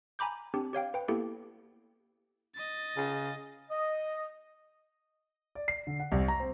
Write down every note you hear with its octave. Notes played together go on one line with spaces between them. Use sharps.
G#5 A#5 B5 D6 G6
C4 D4 G4
G4 C#5 F5 G5
B4 G5
A#3 B3 E4 G4 A4
D#5 A6
C#3
D#5
D5
C7
D3
F#5
C2
A#5
C4